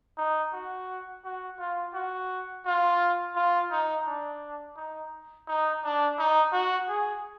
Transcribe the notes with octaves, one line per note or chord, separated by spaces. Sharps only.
D#4
F#4
F#4
F4
F#4
F4
F4
D#4
D4
D#4
D#4
D4
D#4
F#4
G#4